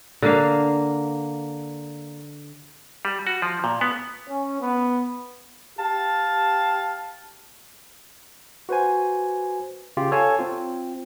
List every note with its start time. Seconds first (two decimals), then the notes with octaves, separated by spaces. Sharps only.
0.22 D3 A#3 F5
3.05 G3
3.27 F#4
3.42 F3
3.64 A#2
3.81 B3
4.27 C#4
4.61 B3
5.79 G4 F5 A5
8.69 F#4 B4 C5 G#5
9.97 C#3 F4 G4
10.12 A4 C#5 F5 G#5 A5
10.39 C4 F4